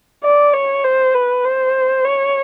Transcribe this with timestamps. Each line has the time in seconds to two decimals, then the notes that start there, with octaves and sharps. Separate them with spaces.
0.24 D5
0.54 C#5
0.85 C5
1.15 B4
1.45 C5
2.05 C#5